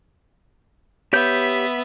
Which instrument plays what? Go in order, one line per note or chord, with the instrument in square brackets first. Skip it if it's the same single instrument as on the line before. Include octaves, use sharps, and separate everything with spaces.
[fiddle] B3 E5 [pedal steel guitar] G4 C#5 G6